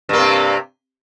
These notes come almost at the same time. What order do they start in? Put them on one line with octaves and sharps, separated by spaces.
G2 A#3 C3